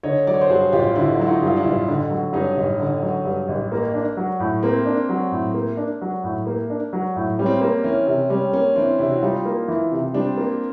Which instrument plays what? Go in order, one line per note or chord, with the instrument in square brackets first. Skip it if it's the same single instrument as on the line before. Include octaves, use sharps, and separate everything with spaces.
[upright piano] D3 [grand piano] C#5 D#5
[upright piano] F#3 [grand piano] D5
[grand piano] C#5
C5 D5
[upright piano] G2 [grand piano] F#4 G#4
[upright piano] A1 [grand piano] F4 G4
[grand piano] G4
[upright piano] D3 [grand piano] E4 F#4
[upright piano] F#3 [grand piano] E4
[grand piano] D#4 F4
[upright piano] G2
[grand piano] F4
D4 E4
[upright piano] A1
D3
F#3
[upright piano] G2 [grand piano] C#4 D#4
[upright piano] A1
D3
F#3
G2
A1
A#3
D4
F#3
A2
[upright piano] A#3 [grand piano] C4
[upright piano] D4
F#3
A2
A#3
D4
F#3
A2
A#3
D4
F#3
A2
[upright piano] G3 [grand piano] C#4
[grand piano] C4
[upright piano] A#3 [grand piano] C4
[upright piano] E3 [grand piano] C#4
[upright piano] C3
[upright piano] G3 [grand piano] C#4
[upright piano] A#3 [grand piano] C#4
[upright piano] E3 [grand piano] C4 D4
[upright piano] C3 [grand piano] D4 E4
[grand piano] F#4
[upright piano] G3 [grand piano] D#4 F4
[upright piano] A#3
E3
C3
[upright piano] G3 [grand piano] C4 D4
[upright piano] A#3